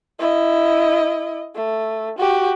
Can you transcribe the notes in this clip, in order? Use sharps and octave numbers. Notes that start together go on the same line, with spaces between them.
E4 D#5
A3
F#4 G4